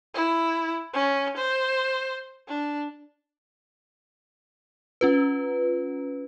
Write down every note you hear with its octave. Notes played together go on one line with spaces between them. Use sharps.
E4
C#4
C5
D4
C#4 F4 B4